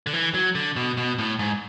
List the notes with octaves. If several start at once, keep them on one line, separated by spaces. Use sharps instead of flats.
D3
E3
F#3
D3
B2
B2
A2
G#2